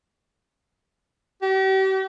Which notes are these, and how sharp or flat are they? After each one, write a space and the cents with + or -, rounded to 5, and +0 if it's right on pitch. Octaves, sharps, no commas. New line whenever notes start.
G4 -40